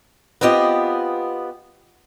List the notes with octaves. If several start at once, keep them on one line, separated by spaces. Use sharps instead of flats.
B3 C4 F4 G4 D#5